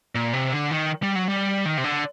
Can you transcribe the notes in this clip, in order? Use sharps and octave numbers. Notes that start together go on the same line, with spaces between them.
A#2
C3
D3
D#3
G3
F#3
G3
D#3
C3
D3